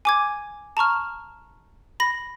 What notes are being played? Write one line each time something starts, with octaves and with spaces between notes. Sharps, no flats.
G#5 D6 G#6
A5 A#5 C#6 F6
B5 A#6